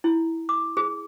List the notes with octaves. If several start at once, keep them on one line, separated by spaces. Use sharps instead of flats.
E4
D6
G#4